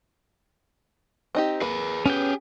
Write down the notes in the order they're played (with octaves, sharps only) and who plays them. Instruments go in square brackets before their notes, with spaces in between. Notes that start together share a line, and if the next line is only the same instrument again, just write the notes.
[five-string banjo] C4 D#4 G4
[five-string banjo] A#3 [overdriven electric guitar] G#4 B4
[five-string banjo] B3 [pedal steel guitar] C#4 G5 [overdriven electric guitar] G4 G#4